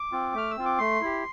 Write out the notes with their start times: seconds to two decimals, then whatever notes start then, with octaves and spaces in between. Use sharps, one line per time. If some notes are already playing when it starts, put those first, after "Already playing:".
Already playing: D6
0.12 C4 F4
0.34 A3 F6
0.51 E6
0.57 C4 F4
0.65 D6
0.78 A3 C6
1.01 E4 G4